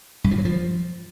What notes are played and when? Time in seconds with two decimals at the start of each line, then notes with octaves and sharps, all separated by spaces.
0.24 G2
0.31 F3
0.38 F#3
0.45 F3